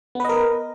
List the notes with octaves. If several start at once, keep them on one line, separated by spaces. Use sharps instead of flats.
B3 A#4 B4 D#5